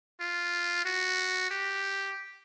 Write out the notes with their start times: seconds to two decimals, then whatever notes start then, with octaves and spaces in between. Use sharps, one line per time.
0.20 F4
0.85 F#4
1.50 G4